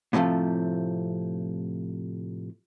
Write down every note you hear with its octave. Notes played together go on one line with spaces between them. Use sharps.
A2 C3 E3 F3 A3